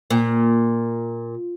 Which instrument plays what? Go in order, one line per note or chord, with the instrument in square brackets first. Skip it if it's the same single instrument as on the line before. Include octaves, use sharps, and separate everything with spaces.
[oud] A#2